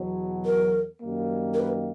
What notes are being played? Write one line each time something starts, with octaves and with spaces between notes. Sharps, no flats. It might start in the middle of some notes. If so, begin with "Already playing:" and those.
Already playing: E2 B2 F#3
A#4
F#2 D#3 G3 A#3
A#4
B4